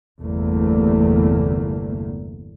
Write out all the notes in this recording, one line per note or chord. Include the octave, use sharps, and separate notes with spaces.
G1 E2 C3 A3 A#3